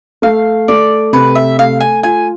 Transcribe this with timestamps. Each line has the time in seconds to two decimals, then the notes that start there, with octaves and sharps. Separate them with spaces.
0.22 A3 F5
0.68 A3 D5
1.13 C3 B4
1.35 E5
1.58 A3 F5
1.80 G#5
2.03 F4 G#5